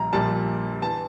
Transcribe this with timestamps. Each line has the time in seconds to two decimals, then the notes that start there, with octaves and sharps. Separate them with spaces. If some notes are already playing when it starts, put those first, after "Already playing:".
Already playing: A#1 A#2 G3 A#5
0.13 A#1 A#2 G3 A5
0.81 E3 A5